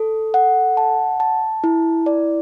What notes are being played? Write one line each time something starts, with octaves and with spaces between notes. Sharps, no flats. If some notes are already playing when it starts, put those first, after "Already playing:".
Already playing: A4
F#5
A5
A5
E4
D5